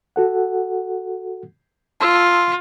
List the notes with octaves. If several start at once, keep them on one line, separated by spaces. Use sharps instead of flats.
F#4 A4 F#5
F4 A5 C6 E6